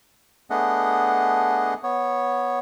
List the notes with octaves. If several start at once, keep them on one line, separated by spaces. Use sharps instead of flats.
A3 B3 D4 G#4 D#5 F#5
B3 C#5